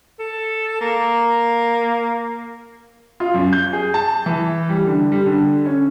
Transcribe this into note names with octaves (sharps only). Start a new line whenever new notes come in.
A4
A#3
F4
F#2
G6
G#4
A5
E3
G3
D3
G3
D3
C#4